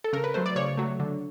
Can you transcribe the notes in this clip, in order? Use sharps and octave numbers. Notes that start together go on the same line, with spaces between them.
A4
C#3 A#4
B4
F#3 A3 C5
D5
C#3 C#5
F#3 A3
D3